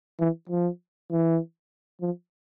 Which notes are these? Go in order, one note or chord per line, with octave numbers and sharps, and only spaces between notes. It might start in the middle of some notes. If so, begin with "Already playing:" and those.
E3
F3
E3
F3